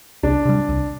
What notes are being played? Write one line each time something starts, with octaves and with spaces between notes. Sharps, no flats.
C2 D4
C3 G3
C2